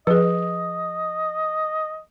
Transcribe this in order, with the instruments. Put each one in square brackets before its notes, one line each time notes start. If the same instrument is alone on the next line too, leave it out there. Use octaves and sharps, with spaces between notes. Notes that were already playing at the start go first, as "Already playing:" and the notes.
[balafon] F3 [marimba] G#4 B4 [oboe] D#5